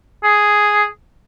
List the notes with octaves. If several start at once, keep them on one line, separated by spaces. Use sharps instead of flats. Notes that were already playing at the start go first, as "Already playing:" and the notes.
G#4